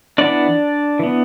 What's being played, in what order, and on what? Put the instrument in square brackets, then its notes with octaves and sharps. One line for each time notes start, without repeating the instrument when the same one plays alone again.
[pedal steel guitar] E3 B3 D4 D5
E3 B3